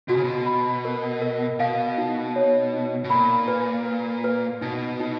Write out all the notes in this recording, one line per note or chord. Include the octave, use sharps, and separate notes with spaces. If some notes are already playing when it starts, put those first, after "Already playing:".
B2 F#4
C#3
B2
B5
A#4
A#4
B2 F5
D#4
C#5
D#4
B2
A#2 B5
B4
B4
B4
B2 D#4
D#4